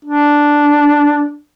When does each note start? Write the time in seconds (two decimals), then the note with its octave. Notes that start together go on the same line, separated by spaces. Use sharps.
0.05 D4